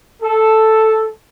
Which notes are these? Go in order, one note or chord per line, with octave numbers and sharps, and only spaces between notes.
A4